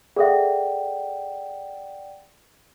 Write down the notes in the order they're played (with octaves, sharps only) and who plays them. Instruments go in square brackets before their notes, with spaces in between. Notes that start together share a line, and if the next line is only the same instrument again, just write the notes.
[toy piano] G#4 A4 E5 [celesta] D5 F#5 G5